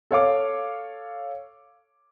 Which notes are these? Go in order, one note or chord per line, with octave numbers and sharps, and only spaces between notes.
A4 C#5 F5 D6